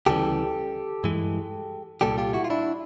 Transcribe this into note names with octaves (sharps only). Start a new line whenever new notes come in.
D2 C#3 E3 G3 G4 A4
G2 E3 G#3
C2 A#2 G3 G4 A4
F4 G4
E4 F#4
F4
D4 E4